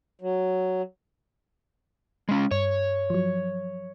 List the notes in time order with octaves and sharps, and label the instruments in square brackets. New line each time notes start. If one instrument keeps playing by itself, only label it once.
[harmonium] F#3
[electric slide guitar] G#3 C#4
[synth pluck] G2 [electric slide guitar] C#5
[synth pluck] F3 F#3